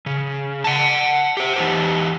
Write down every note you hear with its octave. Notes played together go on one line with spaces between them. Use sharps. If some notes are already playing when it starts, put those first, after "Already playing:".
C#3
F#5 A5
G4 C5
E3 D#4 G4